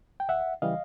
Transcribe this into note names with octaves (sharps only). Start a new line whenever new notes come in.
G5
D2 E5 F#5
C#3 E3 G3 D#5 F5